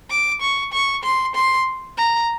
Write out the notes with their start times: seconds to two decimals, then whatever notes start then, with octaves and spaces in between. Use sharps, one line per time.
0.10 D6
0.41 C#6
0.73 C#6
1.04 C6
1.35 C6
1.97 A#5